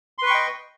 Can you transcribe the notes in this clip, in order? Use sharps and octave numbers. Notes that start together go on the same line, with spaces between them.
B4 D#5 G5 C6 C#6